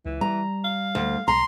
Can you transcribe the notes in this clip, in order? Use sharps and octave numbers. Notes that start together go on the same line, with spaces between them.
C#2 E3
G3 A#5
F5
D2
B1 A#5 C6